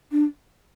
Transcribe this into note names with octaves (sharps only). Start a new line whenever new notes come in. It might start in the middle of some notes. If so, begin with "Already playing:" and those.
D4